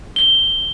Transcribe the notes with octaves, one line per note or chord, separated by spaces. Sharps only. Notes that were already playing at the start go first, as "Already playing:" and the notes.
G7